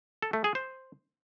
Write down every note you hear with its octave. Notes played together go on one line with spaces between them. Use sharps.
A4
A3
G#4
C5